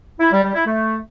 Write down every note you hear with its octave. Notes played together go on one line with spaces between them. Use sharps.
E4
G3
G3
E4
A3